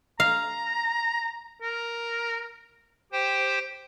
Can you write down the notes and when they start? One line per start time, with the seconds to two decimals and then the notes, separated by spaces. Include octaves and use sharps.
0.20 F5 A#5
1.62 A#4
3.12 G4 C5 G5